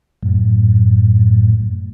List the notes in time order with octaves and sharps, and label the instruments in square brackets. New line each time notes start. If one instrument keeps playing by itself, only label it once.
[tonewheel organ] F#2 A2